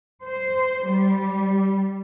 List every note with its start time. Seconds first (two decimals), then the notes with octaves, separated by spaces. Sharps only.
0.24 C5
0.86 G3